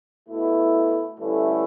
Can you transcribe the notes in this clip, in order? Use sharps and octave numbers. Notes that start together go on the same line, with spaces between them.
B2 A3 E4
G2 D3 A3 C#4 E4